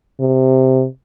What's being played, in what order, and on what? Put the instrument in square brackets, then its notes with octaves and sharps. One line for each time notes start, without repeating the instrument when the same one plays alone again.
[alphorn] C3